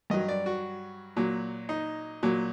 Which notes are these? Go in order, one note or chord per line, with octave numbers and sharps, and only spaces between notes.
G2 F#3 D#5
D5
F#4
A#2 F#3
D#4
A#2 F#3